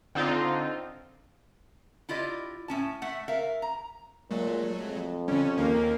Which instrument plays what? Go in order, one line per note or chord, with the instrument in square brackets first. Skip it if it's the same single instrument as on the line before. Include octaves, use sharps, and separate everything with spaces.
[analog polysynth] D3 C4 D#4 F4
[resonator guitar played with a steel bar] E4 F4 G4 D5 D#5
A2 C#4 A5
A3 E5 F#5
A#4 E5 F5
A#5
[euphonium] A#2 [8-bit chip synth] F#3 G#3 A3
[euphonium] F2
[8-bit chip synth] D3 G3 [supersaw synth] C#4
[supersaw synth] D#2 A#3 [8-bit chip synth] D#3 C#4